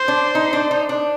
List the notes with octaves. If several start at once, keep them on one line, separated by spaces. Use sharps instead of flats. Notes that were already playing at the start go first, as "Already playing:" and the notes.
Already playing: C5
D4
D#4
D4
D#4
D4